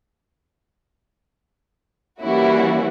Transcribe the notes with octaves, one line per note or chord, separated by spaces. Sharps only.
E3 G3 A#3 C#4 E4 F#4